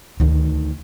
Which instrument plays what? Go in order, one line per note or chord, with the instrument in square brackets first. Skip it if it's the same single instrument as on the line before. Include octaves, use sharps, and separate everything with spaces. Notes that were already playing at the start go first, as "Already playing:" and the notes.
[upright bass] D2 D#3